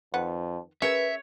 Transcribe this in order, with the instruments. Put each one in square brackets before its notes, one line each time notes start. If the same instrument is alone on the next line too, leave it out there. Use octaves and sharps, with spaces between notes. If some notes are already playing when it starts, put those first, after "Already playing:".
[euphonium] F2 [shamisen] D#3 B4 F#5
[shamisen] C#4 G#4 A#4 [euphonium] B4 [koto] C#5 [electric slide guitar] E5